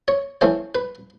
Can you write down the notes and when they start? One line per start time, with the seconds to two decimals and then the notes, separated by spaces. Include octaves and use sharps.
0.08 C#5
0.41 E3 A3 C#4 C5
0.75 B4